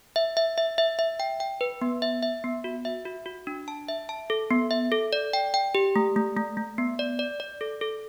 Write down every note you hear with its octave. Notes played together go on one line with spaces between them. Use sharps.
E5
E5
E5
E5
E5
G5
G5
B4
B3
E5
E5
B3
F#4
E5
F#4
F#4
D4
A5
E5
A5
A4
B3
E5
A4
D5
G5
G5
G4
A3
A3
A3
A3
B3
D5
D5
D5
A4
A4